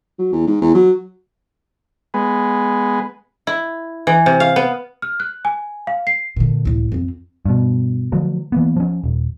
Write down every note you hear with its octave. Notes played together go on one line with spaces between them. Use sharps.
F#3
E2
G#2
E2
F#3
G#3 B3
E4
E3
C3
F5
B3
F6
F#6
G#5
F5
C7
A#2 D3
C#2 A2
F2 C4
G2 B2
D3 F3 F#3 A3
E3 A#3 B3
F3 C#4
D#1